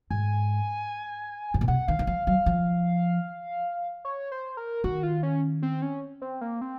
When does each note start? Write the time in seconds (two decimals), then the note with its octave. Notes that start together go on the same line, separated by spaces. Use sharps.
0.10 G#2 G#5
1.54 G#2
1.61 A#2
1.68 C3 F#5
1.88 D#3 F5
1.99 D#3
2.07 F3 F5
2.27 F#3 F5
2.46 F3
4.05 C#5
4.32 C5
4.57 A#4
4.84 D#3 F#4
5.03 F4
5.23 C#4
5.63 C4
5.82 C#4
6.22 C4
6.41 A#3
6.61 C4